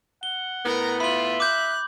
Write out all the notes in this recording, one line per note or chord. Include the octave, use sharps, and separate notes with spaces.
F#5 G7
A2 B3 A#4 A#5
F4 E5 B5 F#7
D6 F#6 G6